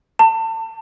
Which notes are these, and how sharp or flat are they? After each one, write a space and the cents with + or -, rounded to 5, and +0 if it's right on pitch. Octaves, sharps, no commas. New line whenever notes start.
A5 +30